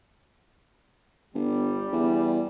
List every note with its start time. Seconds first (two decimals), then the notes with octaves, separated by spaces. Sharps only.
1.34 G1 G3
1.92 E2